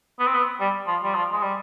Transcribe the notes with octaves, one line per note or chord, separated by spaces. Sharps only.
B3
C4
B3
G3
F3
G3
F3
G#3
G3